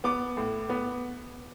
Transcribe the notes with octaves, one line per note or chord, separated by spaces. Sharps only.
B3 D6
A2
B3